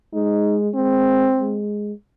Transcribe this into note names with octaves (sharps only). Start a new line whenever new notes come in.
G#3 D#4
G#3 C4
G#3